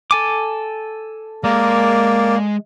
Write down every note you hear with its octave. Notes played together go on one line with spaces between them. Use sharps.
A4 G#5 D6
G#3 A#3 A#4 D5